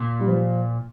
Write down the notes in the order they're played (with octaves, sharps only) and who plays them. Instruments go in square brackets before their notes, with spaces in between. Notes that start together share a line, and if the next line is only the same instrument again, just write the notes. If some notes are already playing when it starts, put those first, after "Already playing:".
Already playing: [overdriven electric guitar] A#2
[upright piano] G3
F3